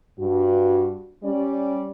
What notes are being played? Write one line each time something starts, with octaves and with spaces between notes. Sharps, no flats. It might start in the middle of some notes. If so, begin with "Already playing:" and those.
G2 F#4
G3 C#4 D5